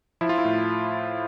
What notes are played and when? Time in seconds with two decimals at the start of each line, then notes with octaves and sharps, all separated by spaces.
0.21 F3 E4
0.29 F4
0.38 E4
0.45 A2